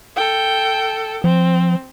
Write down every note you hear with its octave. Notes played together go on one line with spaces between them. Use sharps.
A4 G5
F3 C4